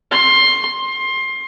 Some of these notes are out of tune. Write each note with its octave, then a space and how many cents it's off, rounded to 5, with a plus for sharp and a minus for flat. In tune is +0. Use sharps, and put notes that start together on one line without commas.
C6 +15
C6 +20